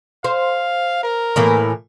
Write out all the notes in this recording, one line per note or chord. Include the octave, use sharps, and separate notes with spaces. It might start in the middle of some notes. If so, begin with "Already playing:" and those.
C5 F5
A#4
A2 E3 A#3